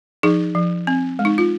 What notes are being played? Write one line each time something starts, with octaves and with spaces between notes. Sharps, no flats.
F3 D#4 G#4
F3
C4
G#3
D#4
F4